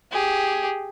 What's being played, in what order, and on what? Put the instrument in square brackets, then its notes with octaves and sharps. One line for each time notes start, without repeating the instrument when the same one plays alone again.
[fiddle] G4 G#4